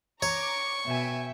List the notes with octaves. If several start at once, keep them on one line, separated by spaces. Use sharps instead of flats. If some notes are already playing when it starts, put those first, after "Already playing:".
C#5 A#5 C#6 D6
B2 E5 G5 G#5